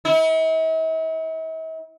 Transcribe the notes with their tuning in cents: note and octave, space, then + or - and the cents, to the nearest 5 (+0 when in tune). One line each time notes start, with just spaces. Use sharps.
E4 -45